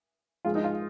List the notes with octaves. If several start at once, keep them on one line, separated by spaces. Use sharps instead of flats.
A#1 G#2 G#3 F4
D#4
F4